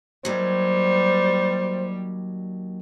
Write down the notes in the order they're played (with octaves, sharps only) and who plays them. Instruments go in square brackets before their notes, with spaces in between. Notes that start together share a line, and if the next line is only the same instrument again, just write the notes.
[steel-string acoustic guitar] D#2 F#3 [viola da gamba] G3 [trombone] C5